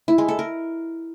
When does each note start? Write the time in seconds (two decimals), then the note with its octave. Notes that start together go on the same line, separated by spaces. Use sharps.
0.08 E4
0.18 G#3
0.28 A4
0.39 A#4